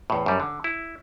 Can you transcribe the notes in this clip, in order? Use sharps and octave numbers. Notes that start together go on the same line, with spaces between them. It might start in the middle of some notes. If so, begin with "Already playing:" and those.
E2 A2
F#2 G3
D3
E4